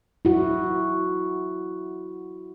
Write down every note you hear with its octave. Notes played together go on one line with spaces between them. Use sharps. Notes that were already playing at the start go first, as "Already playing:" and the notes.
E4 F#4